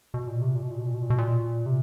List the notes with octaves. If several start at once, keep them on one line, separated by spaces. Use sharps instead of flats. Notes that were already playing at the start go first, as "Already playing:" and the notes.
B2
A#2
C3
A#2
B2
A#2
B2
A#2
B2
A#2
B2
A#2
C3